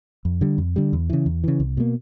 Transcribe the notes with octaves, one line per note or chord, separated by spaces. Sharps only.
F2
D3 G3
F2
D3 G3
E2
C#3 E3
E2
C#3 E3
C2
B2 G3 A#3